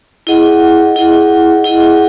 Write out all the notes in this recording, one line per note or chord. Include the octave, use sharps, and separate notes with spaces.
E4 G#4 D#5 F#5
E4 G#4 D#5 F#5
E4 G#4 D#5 F#5